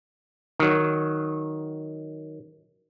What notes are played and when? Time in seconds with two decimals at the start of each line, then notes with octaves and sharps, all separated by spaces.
0.60 D#3 F#3